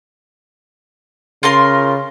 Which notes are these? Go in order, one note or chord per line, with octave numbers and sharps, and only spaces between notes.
C#3 F4 A#4 C6